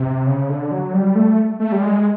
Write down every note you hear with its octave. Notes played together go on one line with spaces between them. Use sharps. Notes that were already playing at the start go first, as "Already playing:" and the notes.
Already playing: C3
C#3
D3
F#3
G3
A3
A3
G3
G#3